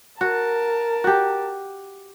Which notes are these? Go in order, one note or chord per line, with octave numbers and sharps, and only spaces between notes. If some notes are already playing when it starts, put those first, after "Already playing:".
F#4 A#4 A5
F#4 G4